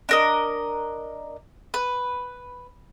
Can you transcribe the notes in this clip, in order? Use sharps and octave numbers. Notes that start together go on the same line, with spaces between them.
D4 A#4 D#5
B4